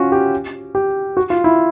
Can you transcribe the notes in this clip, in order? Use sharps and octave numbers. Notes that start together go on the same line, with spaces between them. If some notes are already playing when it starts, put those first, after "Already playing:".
Already playing: C#4 F4 F#4
G4
G4
F#4
F4
E4